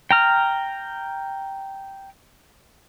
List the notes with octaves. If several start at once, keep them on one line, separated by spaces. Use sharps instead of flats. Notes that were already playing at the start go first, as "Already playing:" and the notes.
G5 A#5 F6